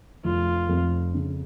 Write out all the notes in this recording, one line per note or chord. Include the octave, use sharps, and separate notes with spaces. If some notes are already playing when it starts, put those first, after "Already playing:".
F1 F4
F2
C#3